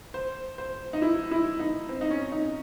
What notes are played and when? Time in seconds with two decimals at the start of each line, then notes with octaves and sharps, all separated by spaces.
0.14 C5
0.58 C5
0.93 D#4
1.02 E4
1.31 E4
1.59 D#4
1.89 C4
2.01 D#4
2.10 C#4
2.32 D#4